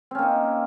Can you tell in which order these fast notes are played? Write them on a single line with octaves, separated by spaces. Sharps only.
C4 C#4 A#3 D#4